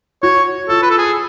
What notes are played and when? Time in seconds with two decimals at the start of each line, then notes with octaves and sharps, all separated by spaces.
0.23 F#4 C#5
0.69 F4 A4
0.83 B4
0.90 A4
0.98 G#4